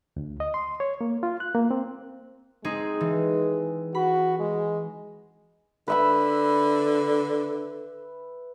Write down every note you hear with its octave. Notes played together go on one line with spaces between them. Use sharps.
D2
D#5
C6
C#5
A#3
F4
F#6
A#3
C4
G#3 C4 D#4 G#4
E3
F#4 B5
G#3
D3 B4 E5 B5